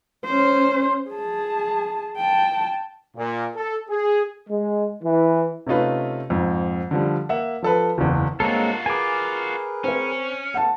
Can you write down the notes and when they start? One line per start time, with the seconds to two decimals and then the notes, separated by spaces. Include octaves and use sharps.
0.25 C#4 C5
1.11 G#4 A5
2.17 G5 A5
3.17 A#2
3.56 A4
3.90 G#4
4.49 G#3
5.03 E3
5.67 C3 A3 C#4 D#4 F4 B4
6.30 F2 G#2
6.91 D3 F3 G3
7.29 A#3 E5 F#5
7.62 F3 A4 B4
7.98 F#1 E2
8.40 G2 G#3 A#3 C4 F4 F#4 A4 C#5
8.86 G#4 A#4 B4 G#5 D6
9.84 C4 C#4 C5
10.54 A3 B3 F#5 A5